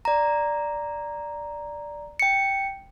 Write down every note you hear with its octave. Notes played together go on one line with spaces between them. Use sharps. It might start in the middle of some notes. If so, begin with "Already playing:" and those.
D5 A#5
G5 C#7